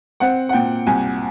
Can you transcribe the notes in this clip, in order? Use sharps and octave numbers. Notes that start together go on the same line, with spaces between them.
C4 F#5
F#5
A#2 G5
C2 G#5